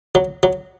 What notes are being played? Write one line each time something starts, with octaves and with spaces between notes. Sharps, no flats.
F#3
F#3